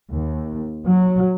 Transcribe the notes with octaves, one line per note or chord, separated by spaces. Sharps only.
D#2
F#3